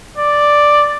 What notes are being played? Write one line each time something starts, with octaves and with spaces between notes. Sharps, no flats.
D5